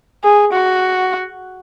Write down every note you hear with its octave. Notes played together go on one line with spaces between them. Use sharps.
G#4
F#4